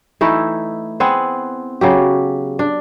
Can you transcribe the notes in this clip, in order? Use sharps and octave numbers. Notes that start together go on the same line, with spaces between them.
E3 A3 D#4 E4
B3 C4 G#4 F#5
C#3 F#3 G4
D4